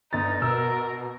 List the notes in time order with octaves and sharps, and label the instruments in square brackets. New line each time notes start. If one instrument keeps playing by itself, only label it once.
[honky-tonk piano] G1 A6 [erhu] D#4
[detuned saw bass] B2 [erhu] A#4 [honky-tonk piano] E6